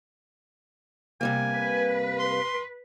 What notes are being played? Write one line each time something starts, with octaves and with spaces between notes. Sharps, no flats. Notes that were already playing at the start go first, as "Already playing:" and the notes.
C3 G3 A#3 G#5
B4
C6